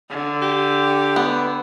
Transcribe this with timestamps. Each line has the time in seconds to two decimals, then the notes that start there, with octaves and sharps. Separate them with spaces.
0.10 D3
0.42 G4
1.16 B3